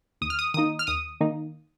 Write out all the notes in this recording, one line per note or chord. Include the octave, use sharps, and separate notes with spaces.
D#2 D#6
F6
D#6
D#3 A#3 D#4 D#6
F6
D#2 D#6
D#3 A#3 D#4